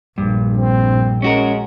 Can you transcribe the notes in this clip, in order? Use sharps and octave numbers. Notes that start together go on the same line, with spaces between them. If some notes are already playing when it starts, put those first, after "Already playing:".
A#1 G2
C4
G#3 C#4 F#4 A#4